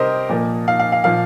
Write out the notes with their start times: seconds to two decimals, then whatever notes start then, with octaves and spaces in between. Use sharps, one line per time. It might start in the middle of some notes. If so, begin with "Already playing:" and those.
Already playing: C3 G3 C4 G4 A#4 C5 D#5
0.29 A#2 F3 A#3
0.68 F5
0.79 F5
0.92 F5
1.04 A#2 F3 A#3 F5